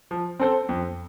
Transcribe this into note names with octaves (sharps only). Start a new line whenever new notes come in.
F3
C4 A4 C5
F2